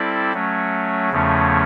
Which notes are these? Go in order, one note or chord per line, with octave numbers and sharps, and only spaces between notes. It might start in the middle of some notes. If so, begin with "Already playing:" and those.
Already playing: G3 C4 E4 A4 D5
F#3 A3 C#4
E2 C#3 F3 A3 C#4